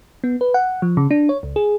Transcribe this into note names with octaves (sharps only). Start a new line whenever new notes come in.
B3
B4
F#5
F3
C#3
D4
C#5
C#2
G#4